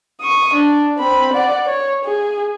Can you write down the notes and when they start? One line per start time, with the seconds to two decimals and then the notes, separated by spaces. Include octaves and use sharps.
0.21 C#6 D#6
0.54 D4
0.97 C4 B5
1.33 D5 F#5
1.66 C#5
2.05 G#4